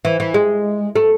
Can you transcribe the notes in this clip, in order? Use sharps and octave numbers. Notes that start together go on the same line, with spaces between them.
E3
E3
G#3
A3